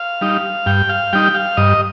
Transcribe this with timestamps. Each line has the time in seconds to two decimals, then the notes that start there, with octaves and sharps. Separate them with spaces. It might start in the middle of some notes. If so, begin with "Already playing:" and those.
Already playing: F5
0.21 G3 D#4
0.66 G2 G5
0.89 F5
1.13 G3 D#4 G5
1.34 F5
1.57 G2 D#5